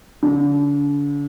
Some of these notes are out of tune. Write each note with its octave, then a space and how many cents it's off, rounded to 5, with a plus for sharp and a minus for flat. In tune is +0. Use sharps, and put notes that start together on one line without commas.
D3 -40